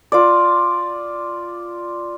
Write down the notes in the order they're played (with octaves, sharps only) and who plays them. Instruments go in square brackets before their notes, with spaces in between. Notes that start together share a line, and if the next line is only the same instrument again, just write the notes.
[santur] F4 D5